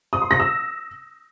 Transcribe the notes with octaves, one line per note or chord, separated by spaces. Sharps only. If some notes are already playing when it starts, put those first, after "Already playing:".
D#6
C6
A#6
E6